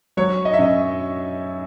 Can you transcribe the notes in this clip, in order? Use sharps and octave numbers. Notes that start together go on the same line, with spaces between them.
F#3 C#5
D#5
E5
F#2 D#5